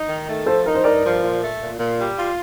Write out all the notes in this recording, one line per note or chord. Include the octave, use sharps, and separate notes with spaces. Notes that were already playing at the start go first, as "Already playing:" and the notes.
Already playing: D#4
D#3
A3
F3 A4 C5
D#4 A#4
C5
G2 A#4 D5
F3
A#2
A3
A#2
A#2
G3
F4